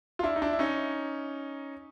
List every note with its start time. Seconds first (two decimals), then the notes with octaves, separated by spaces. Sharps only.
0.19 F4
0.23 D4 E4
0.36 D#4
0.42 D4 E4
0.53 E4
0.59 C#4 D#4